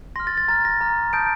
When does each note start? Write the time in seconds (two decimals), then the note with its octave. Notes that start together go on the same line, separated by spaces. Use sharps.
0.16 C6 F6 A#6
0.27 A6
0.38 A6
0.48 A#5 F6 A6
0.65 A#6
0.81 A#5 D6 F6
1.13 A5 D#6 G6 D7